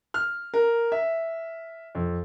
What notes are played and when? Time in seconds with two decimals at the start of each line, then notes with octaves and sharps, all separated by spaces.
0.14 F6
0.54 A#4
0.92 E5
1.95 F2